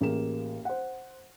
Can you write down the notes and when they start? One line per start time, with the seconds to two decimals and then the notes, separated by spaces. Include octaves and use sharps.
0.01 A1 A#3 G#4 E7
0.65 C5 F#5